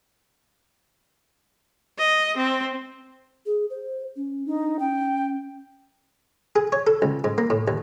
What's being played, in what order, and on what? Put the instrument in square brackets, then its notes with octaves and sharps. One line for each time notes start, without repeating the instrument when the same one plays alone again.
[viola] D#5
C4
[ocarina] G#4
C5
C#4
[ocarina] D4 [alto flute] D#4
[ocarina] C#4 [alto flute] G5
[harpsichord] G#4
C#5
A4
C#2
G#2
A#3
A2
D#2